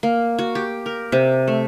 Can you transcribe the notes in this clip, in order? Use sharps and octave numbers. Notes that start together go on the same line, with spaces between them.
A#3
F#4
G4
A#4
C3
A3